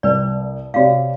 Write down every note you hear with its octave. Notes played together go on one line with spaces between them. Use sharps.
C2 B4 D5
C3 F#4 C#5 D5 F5